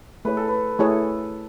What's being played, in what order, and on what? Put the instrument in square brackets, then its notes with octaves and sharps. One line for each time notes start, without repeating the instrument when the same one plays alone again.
[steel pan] A3 E4 G#4 C#5 [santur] B4
[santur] A4
B4
[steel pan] A3 E4 G#4 C#5 [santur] A4